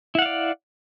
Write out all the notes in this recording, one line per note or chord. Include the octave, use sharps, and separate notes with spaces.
E4 D5 F5 F#5